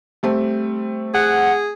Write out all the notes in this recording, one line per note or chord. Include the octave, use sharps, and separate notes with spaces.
G3 A3 C4
G#4 F#5